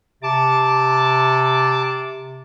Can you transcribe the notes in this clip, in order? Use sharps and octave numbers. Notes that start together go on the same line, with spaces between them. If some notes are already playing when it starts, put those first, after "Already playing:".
C3 A5 D6